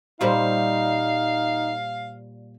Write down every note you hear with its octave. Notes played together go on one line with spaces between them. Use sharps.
A#2 G3 D#4 C5 F5